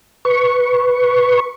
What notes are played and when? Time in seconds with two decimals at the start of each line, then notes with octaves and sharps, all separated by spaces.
0.25 B4 C#6